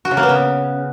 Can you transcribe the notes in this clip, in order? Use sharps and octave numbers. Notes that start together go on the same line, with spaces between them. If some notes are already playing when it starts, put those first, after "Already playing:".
F#4
C#3
A#3
B3
C#3